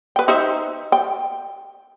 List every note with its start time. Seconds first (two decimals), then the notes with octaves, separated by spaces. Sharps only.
0.16 B4 G5
0.28 D#4 C5 E5
0.92 G5